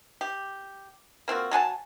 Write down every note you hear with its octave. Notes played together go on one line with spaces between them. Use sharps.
G4
A#3 C4 F4 F#4
F#3 F#5 G#5 A5